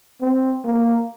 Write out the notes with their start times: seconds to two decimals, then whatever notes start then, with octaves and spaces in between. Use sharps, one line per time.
0.21 C4
0.65 A#3